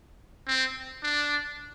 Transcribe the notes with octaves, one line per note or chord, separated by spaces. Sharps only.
C4
D4